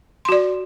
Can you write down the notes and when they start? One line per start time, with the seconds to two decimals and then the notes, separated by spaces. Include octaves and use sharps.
0.25 C6
0.29 F#4
0.32 D5